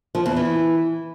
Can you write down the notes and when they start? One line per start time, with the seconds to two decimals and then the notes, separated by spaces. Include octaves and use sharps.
0.15 F3
0.26 E2
0.37 E3